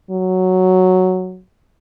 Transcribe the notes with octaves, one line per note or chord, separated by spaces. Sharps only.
F#3